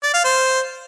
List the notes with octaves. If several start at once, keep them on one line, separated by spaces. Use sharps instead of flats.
D5
F5
C5